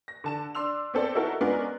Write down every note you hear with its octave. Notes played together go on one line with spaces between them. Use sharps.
A#6
D3 A5 E7
D4 C6 E6 F7
B3 C4 A4 D5
D#4 E4 F#4 A4 A#4
G#3 B3 C#4 D4 F4 A#4